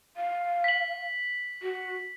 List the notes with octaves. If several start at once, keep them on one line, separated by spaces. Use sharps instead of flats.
F5
B6 F#7
F#4